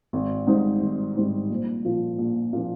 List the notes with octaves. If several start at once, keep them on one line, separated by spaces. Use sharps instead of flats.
G#1
G#2 G3 C4 D#4
G#1
G#2 G3 C4 D#4
A#1
A#2 F3
A#1
A#2 F3